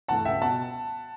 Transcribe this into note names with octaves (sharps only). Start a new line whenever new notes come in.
G2 E3 A3 F#5 A5
C#2 E5 G5
B2 F#5 A5